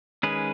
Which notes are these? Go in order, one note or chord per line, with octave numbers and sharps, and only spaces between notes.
D#3 G#3 C#4 G#4 B4